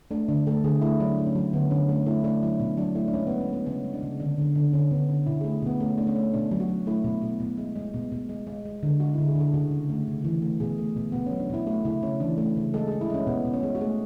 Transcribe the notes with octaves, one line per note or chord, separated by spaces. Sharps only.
A3 D4
D3 D4
A3 A4
D3 G#4
A3 E4
F#3 D4
A3
C#4
F#3
D3 B3
D3 C#4
A3 C#4
A3 E4
A3 D4
F#3 E4
B2 D4
F#3 D4
A3 E4
D4
G#3 C#4
B3
G#3
C#4
G#3 B3
C#3 C#4
G#3
D4
C#3
D3 D4
D3
D3
D3 C#4
D3 B3
D3 C#4
B2 E4
A3 G#4
B2 B3
A3 C#4
A3 D4
C#4
A3
B2 D4
F#3
F#4
F#3
A3 E4
B2
B2
B2
G#3
G#3
B2
B2
G#3
G#3
G#3
D3
G#3 F#4
D3 E4
G#4
D3 A4
C#3 F#4
C#3
A3
C#3
E3
A3
B2 G#4
A3
B2
B2 B3
F#3 C#4
D4
B2 E4
A3 F#4
C#3 E4
C#3 C#4
E3 D4
A3
C#3
G#3 A4
G#3 G#4
E4
G#3 C#4
B2 B3
B2
C#4
G#3
F#4
A3 G#4